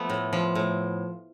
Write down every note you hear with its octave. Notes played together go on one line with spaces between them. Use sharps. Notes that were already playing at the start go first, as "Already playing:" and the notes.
Already playing: F3 A3 B3
A2
F3
A2